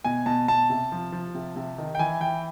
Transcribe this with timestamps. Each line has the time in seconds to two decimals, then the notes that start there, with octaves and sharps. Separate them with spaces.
0.04 B2 G#5
0.26 B2 A5
0.48 B2 A5
0.70 C3
0.92 F3
1.12 F3
1.35 C3
1.56 C3
1.78 D#3
1.95 G5
1.99 E3 G#5
2.20 E3 G5